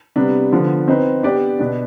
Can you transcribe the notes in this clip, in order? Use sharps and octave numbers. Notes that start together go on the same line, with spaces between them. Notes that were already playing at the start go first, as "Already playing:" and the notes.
C3 G3 B3 D4
D3 F3 B3
C4 D#4 B4
B3 D4 G4 D5
B2 B3 D4